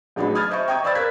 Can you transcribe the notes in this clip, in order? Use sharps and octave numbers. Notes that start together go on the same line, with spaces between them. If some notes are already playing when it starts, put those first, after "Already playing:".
A1 F#3 D4 D#4 G#4 B5
B5 D#6 F6 G#6 A6
C5 D#5 E5 C#6
G5 A#5 C#6 D#6 G#6
C5 D5 F5 B5 E6 A6
A#4 F#6 G#6 B6